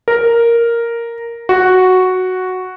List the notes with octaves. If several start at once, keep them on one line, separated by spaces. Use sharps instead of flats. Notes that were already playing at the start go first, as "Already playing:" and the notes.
A#4
F#4